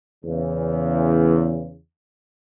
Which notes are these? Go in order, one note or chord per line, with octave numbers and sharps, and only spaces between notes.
E2 C#3